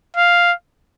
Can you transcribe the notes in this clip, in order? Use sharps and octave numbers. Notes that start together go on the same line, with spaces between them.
F5